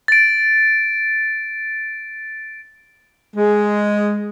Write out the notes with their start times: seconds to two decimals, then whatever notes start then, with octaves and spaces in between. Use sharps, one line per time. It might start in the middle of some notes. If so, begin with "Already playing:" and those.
0.08 A6 D7
3.35 G#3